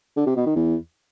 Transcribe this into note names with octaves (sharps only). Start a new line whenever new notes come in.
D3
C3
B2
D#3
E2